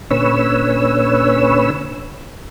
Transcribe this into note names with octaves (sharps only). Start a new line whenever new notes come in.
A#2 D3 C#4 B4 C#5 E6